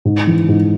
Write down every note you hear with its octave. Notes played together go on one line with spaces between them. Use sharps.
G#2
E3
G#2